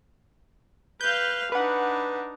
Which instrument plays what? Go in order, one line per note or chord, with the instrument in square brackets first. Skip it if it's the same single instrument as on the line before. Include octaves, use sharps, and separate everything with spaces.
[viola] B4 F5 [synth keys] G6
[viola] D4 D#4 [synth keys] B4 F#5